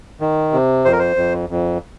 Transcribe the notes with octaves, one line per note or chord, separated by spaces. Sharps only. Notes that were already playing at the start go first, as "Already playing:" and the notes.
D#3
C3
F2 C5
A#4
C5
F2
F2